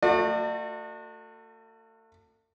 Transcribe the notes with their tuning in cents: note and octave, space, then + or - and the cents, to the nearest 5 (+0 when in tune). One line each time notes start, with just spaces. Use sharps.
A3 +35 F#4 -25 D5 +45